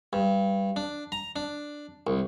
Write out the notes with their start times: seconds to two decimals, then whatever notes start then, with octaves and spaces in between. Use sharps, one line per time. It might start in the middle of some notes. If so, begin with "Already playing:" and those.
0.13 G2
0.76 D4
1.12 A#5
1.36 D4
2.07 C2